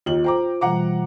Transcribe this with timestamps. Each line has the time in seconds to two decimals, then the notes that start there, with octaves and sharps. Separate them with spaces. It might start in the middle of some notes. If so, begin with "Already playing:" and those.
0.06 D#2 D#4 F4 F#7
0.24 C5 G5 A#5 D6
0.61 B2 E3 G3 F#5 A#5 D6